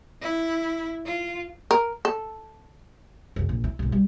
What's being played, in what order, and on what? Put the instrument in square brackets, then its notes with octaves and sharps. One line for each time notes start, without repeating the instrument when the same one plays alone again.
[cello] E4
F4
[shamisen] A#4
A4
[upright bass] F#2 C#3
A#1
E4
B1 G#2
G3